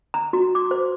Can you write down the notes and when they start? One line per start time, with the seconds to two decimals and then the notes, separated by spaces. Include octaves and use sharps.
0.14 A#5
0.33 F#4
0.55 D6
0.71 C5